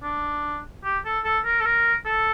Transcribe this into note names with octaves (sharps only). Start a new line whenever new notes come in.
D4
G4
A4
A4
A#4
A4
A#4
A4